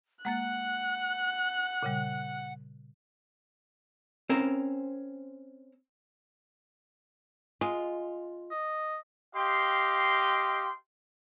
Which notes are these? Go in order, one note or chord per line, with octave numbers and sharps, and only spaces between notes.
G#3 A#3 F#5 F#6 A6
A#2 C#3 G3
C4 C#4 A#4 C5
G#3 F4
D#5
G4 D#5 F5 G5 C6